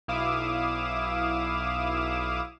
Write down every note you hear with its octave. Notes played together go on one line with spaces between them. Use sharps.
B1 E4 F5 D6 D#6 E7